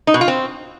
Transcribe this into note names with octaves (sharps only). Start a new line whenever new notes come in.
D#4
B2
F4
C4